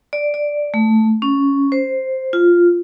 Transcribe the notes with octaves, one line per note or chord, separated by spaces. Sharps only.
D5
D5
A3
C#4
C5
F4